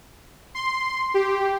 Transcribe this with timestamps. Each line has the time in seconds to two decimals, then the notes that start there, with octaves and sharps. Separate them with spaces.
0.55 C6
1.14 G4